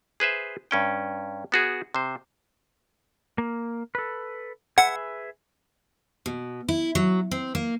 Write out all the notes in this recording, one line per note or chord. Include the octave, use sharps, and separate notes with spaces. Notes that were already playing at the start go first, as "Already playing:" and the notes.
G#4 B4 C5 E5
G2 C#4 G5
B3 F#4 G#4
C3 C5
A#3
A4 B4
G#4 B4 E5 F#5
B2
E4
F#3
C4
A#3